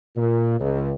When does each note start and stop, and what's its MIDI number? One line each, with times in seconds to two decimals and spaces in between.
0.16 0.55 46
0.59 0.93 37